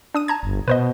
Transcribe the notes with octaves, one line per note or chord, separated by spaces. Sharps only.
D4 D#6 D#7
A5 A#5 G#6
G1
B2 B4 C5 D#5